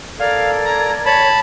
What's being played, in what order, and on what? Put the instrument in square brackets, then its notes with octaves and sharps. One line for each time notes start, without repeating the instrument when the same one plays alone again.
[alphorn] A4 [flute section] A#4 D5 G#6 [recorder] F5
[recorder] A#5
[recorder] C#5 [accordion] A5 B5